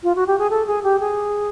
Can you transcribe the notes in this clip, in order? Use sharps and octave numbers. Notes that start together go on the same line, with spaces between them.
F4
F#4
G4
G#4
A4
G#4
G4
G#4